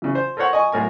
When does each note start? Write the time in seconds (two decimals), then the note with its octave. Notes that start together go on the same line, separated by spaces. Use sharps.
0.02 C#3 E3
0.15 C5
0.37 A4 A#4 C5 C#5 F#5
0.53 D#5 G#5 C#6
0.72 B1 A2 A#4 G#5